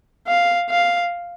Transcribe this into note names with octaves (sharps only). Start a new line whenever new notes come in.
F5
F5